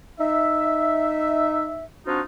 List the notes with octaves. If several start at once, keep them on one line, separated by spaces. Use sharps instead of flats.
D#4 E5
C4 D4 D#4 F4 F#4